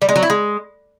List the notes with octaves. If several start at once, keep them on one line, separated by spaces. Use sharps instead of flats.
G3
G#3
F#3
E4
G#3